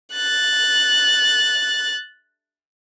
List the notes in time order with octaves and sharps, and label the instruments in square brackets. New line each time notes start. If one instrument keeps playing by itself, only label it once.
[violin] F#6 A6